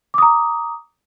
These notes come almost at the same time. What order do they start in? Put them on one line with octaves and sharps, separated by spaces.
D6 D#6 A#5